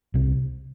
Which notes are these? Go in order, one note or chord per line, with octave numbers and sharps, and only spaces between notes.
C2 C3